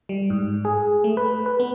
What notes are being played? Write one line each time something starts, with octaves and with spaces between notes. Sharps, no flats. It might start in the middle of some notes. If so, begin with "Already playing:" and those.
G3
G#2
G#4
A3
B4
B4
B3